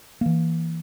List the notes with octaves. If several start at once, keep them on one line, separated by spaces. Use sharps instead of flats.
E3 A#3